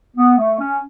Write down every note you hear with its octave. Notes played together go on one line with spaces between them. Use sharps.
B3
A3
C#4